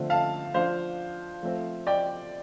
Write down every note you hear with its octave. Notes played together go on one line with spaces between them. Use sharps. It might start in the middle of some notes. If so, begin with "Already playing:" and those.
Already playing: D3 F3 A3 C4
F5 A5
F3 D4 C5 F5
F3 A3 C4
D5 G5